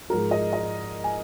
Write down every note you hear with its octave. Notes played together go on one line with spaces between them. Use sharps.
G#2 F3 G#3 A#4
D#5
D#5
G#5